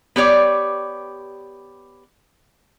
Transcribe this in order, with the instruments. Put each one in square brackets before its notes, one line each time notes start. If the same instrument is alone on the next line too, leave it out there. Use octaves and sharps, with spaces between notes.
[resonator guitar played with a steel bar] B3 G4 C#5 D5